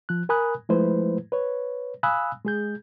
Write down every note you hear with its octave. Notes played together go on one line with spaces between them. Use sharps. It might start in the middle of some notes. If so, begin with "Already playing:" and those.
F3 F#6
A#4 G#5 B5 D#6 F#6
F3 G#3 A3 E4 B4 C5
B4 C#5
F5 G#5 B5 D#6 E6 F#6
G#3 G#4 G6